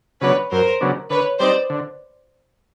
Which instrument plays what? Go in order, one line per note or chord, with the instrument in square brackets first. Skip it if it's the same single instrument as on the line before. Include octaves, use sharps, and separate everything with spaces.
[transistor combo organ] C#3 F#3 B3 D4 [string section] B4 C#5
[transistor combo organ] F#2 [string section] A#4 C5
[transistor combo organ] C#3 F#3 B3 D4
[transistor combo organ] D3 [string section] B4 C#5
[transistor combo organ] G3 C4 D#4 [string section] C5 D5
[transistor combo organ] D3